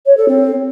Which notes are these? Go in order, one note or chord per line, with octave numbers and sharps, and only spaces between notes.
C#5
A4
C4